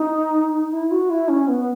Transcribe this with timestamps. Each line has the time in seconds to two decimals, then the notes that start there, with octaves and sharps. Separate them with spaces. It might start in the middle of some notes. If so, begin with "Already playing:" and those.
Already playing: D#4
0.72 E4
0.91 F#4
1.10 E4
1.29 C#4
1.48 B3